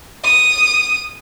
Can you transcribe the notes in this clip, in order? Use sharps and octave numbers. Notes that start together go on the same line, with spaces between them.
D#6